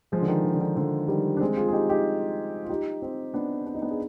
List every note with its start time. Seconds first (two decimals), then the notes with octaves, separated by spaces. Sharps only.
0.12 F3 G#3
0.21 D3
0.28 D#3
0.44 D3
0.54 D3
0.61 D#3
0.77 D3 F3
1.08 D#3 G3
1.37 D4
1.40 G#3 C4
1.57 F4 G#4
1.68 G#4
1.73 D#4 G4
1.89 D#4 G4
2.65 F4
2.69 D#4 G4
3.02 C4 D#4
3.34 B3 D4
3.66 D4
3.74 D#4
3.82 B3 D4
3.91 G#4